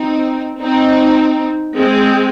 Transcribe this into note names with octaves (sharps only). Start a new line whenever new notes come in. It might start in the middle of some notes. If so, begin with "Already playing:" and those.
Already playing: C4 D#4
C4 D#4
G#3 C4